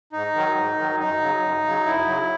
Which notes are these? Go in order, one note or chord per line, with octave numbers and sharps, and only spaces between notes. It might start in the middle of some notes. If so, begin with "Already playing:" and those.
G#2 D#4
D#3 F#3
G#2
D#3 F#3
F#2 D#4
C#3 F#3
F#2
C#3 F#3
F#2 E4
C#3 F#3